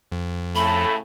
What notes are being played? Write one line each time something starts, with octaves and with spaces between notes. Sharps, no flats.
F2
A2 C#3 A3 B5